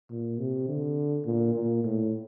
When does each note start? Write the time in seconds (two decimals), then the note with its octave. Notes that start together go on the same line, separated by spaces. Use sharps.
0.10 A#2
0.38 C3
0.68 D3
1.26 A#2
1.54 A#2
1.84 A2